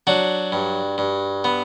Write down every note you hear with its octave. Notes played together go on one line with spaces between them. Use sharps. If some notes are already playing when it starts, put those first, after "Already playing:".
F#3 D4 F#4
G2
G2
B3